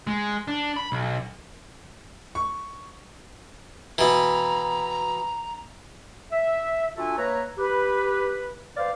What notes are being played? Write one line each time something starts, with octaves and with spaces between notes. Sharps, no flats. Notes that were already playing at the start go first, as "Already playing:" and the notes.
G#3
D4
B5
B1
C#6
B2 E3 A#5
E5
D4 F4 F#4 A4 E5 G#5
A#3 B4 C#5 E5 A#5
G4 B4
B4 C5 D5 F5